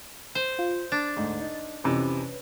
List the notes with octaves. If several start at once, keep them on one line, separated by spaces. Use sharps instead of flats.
C5
F4
D4 A6
D2 G#2
D#4
F2 C3 E3 C#4 B4